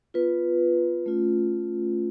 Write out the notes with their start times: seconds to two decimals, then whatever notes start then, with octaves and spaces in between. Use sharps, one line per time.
0.14 B3 F4 B4
1.06 A3 C#4 F4